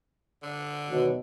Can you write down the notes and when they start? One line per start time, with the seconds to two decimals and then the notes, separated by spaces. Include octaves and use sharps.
0.43 D3
0.90 D#2 B2 F#3